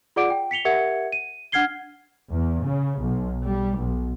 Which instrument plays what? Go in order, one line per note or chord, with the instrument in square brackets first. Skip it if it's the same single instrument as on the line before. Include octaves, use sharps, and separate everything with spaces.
[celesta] F4 G#4 D5 F#5 D6 D7
G5
B6 C#7 F7 G7
G4 A#4 E5 F#5 G#6 C#7
D#7
D4 F#5 F6 G#6 C7 G7
[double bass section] E2
C#3
B1
G3
B1